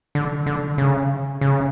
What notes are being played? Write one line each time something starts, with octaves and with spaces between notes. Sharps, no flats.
D3
D3
C#3
C#3